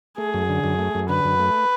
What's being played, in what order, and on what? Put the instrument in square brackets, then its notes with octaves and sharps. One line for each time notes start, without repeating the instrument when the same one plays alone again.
[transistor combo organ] A3 [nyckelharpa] G#4
[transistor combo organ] F#2
D3
F#2
A3
F#2
[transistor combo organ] D3 [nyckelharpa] B4
[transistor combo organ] F#2
A3